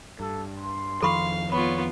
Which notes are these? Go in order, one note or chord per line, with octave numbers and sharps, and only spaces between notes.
G2 A4
C6
F2 D#3 F3 A4 F5 B5 C#6
B3 F4 C#5 B5